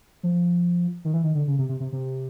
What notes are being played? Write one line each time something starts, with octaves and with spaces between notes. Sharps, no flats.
F3
D#3
E3
D#3
D3
C#3
C3
C3
C3
C3